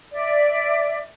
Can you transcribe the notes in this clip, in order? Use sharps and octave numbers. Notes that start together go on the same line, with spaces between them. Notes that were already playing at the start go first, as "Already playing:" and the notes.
D5 E5